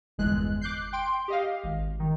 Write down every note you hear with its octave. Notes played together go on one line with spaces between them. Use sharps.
G1 E2 G#3 F#6
D6 F#6 G6 C7
G5 C6 D7
G4 D#5 F5
G#1
D#3